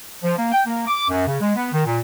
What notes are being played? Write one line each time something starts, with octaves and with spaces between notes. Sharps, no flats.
F3
A#3
G5
A#3
D6
F#2
C#3
G#3
B3
D#3
A#2